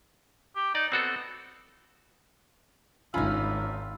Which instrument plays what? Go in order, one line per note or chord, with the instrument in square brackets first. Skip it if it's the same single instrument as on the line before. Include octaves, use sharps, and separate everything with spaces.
[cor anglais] G4
[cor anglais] D#4 [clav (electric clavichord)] D5
[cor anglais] B3 [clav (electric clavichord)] C4 F#4 A4
[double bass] G#1 [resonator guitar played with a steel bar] C#4 D#4 [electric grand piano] F4 B5 [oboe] E5